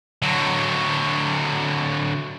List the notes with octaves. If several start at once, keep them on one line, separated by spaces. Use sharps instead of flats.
D3 F#3